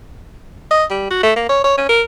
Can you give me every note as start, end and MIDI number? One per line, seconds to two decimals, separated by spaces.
0.71 0.84 75
0.90 1.10 55
1.10 1.22 66
1.23 1.32 57
1.36 1.44 58
1.49 1.63 73
1.64 1.77 73
1.77 1.87 61
1.89 2.02 70